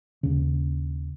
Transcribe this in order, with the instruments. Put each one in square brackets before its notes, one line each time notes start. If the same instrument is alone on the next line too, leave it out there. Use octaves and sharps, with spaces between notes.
[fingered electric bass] D#2 C#3